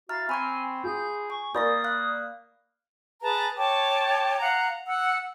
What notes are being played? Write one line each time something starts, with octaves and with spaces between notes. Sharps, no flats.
E4 F#4 F5 A#5 F6 A6
C4 G#5 B5 C#6 G#6
F4 G#4 G6
G#5 C#6
A#3 A#4 D5 B5 D#6 G6 A6 A#6
F5 F#6
G#4 B4 A5 A#5
C#5 G5 A5 D6
F5 F#5 A#5
F#5 E6